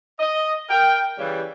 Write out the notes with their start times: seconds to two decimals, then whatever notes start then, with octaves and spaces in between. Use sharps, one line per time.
0.19 D#5
0.69 A#4 G5
1.19 C#3 E3 G3